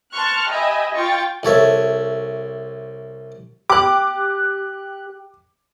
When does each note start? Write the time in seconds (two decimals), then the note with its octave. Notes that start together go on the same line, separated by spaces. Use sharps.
0.13 A5 C6 C#6 F6 F#6
0.50 G4 D#5 E5 G#5 B5
0.94 F4 G5 C#6 A6
1.43 C2 A4 C#5 E5
3.70 G4 D6 F#6